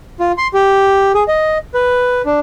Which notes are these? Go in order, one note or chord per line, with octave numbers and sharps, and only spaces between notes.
F4
C6
G4
G#4
D#5
B4
D4